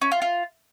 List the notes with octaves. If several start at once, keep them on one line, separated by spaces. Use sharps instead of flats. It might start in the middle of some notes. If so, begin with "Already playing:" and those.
C#4
F4
F4